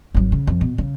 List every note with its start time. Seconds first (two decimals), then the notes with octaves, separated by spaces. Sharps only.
0.15 G#1 F#3
0.32 C#3
0.47 F2
0.61 B2
0.78 C#3